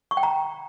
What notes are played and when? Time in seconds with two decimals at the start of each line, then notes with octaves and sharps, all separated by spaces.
0.11 C#6
0.17 G5
0.23 A#5